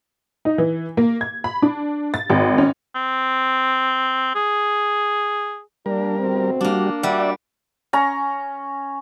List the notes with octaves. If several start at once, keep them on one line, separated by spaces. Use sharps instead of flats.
D#4
E3
A#3
G#6
B5
D4
A6
G#1
C#4
C4
G#4
G3 A#3 D4 A#4
D2 B2 C4
G3 A#3 D4 F#4
G3 D4 F#4 D5 E5 F#5
C#4 A#5